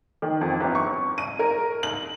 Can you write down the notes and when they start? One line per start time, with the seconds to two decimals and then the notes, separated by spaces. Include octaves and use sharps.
0.22 D#3
0.41 F2
0.60 G1
0.75 C#6
1.18 D#7
1.39 A#4
1.83 F#7